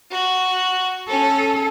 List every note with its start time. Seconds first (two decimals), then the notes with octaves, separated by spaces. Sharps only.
0.10 F#4
1.08 C#4 A4